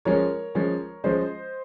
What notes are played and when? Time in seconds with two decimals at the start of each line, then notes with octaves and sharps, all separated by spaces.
0.05 F3 G#3 C#4 A#4 C#5
0.55 F3 G#3 C#4
1.04 F3 G#3 C#4 C5 D#5